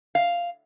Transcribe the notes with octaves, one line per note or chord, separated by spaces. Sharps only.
F5